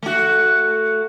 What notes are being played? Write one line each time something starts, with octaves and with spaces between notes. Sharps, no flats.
A3 F#4